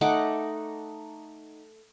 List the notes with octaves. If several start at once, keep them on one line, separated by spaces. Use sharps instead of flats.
A3 D#4 F#5 D6